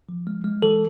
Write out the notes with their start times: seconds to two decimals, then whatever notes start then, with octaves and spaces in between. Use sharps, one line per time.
0.09 F3
0.27 G#3
0.44 G#3
0.62 E3 A4